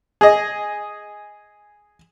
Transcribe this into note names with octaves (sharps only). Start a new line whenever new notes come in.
G#4 D#5